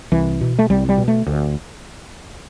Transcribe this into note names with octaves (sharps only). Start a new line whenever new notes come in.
C2 E3
B2
A3
C2 G3
G3
B2
A3
D2